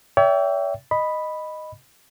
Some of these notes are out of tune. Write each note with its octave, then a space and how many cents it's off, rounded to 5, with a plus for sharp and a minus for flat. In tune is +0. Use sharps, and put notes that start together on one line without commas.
C#5 +45 E5 +0 G5 +0
D#5 -5 B5 +0